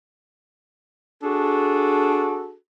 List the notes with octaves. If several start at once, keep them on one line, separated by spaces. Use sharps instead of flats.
D4 F#4 G#4 A4